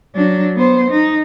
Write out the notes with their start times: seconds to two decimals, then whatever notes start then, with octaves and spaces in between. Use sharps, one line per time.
0.15 F#3 D4
0.56 B3 C5
0.91 D#4